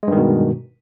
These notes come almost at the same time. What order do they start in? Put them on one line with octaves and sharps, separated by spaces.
G#3 G2 D#3 B2